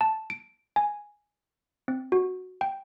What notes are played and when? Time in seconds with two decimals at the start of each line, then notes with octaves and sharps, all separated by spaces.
0.01 A5
0.30 D7
0.76 G#5
1.88 C4
2.12 F#4
2.61 G5